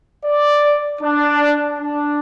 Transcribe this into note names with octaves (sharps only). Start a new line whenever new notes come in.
D5
D4
D4